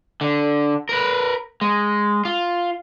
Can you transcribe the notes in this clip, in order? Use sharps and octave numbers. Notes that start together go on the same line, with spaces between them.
D3
A#4 B4
G#3
F4